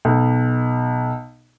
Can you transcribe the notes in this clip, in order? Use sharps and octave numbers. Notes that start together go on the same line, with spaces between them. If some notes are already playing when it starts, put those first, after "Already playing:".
B1